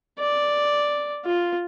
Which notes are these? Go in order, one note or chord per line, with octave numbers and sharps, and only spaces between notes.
D5
F4